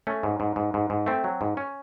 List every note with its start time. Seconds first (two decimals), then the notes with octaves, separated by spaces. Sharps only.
0.07 A3 C#4
0.23 G#2
0.40 G#2
0.56 G#2
0.74 G#2
0.90 G#2
1.06 A3 C4
1.24 F#3
1.41 G#2
1.57 C#4